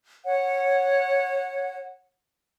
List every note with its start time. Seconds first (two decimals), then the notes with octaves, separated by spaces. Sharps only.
0.24 C#5 F#5